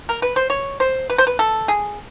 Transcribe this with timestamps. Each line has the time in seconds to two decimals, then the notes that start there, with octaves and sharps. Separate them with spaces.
0.09 A#4
0.22 B4
0.36 C5
0.50 C#5
0.80 C5
1.10 B4
1.18 C5
1.27 B4
1.39 A4
1.68 G#4